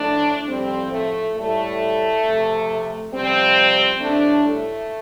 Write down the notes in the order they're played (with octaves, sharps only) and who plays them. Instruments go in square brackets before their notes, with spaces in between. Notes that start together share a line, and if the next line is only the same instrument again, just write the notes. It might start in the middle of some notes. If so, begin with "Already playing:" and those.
Already playing: [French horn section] A2 F3 A3 D4
A2 F3 G3 C4
A3
A2 G3 A3
C3 F3
C3 F3 G3 C4
A2 G3 A3 D4
A3